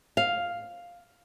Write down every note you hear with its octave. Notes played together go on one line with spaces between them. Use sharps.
F5